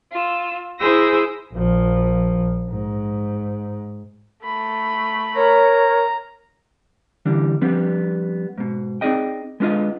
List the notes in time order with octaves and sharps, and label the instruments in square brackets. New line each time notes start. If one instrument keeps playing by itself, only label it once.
[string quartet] F4 E6
E4 G#4 C5 E6 A#6
[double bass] A#1 F3
G#2
[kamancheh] A3 B5
[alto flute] A#4 [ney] C#5 [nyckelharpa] A#5
[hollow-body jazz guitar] D3 E3 G3 D4
F3 G3 B3 C4 D4
G#2 B2
C4 D#4 G#4 D5 D#5 G5
G#3 B3 D4 F4 D#5